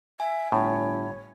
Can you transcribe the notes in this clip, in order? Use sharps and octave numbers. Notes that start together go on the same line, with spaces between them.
E5 G#5
G1 A2 C#5